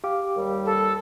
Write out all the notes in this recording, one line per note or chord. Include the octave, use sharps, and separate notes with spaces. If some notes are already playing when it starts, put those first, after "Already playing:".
G4 F5 D6
D#2 G3
A4